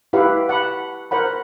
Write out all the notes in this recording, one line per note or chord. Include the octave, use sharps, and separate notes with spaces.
E4 G4 B4 F5 F#5
F#5 A5 B5
A#4 C5 F#5 B5